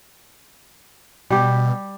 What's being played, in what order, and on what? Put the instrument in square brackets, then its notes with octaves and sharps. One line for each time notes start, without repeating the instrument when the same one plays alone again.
[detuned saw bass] B2 [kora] G3 G4